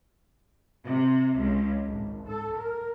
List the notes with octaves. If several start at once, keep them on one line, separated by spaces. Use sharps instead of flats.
C3
C#2
G#1
A4
A#4